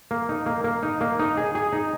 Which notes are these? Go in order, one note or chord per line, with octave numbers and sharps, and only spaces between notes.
A#3
D#4
A#3
A#3
D#4
A#3
D#4
G#4
G#4
D#4